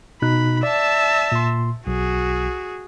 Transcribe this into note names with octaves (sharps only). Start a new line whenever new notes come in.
B2 D#4 B5 F#6
D5 E5 A5
A#2 C6
B1 F#4 G#4